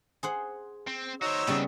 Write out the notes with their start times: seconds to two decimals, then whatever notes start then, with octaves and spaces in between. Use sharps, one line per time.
0.23 G#4 C5 F#5
0.87 C4
1.22 D#4 F#4 C5 C#5 E6
1.47 C#3 G3 B3 C4 B4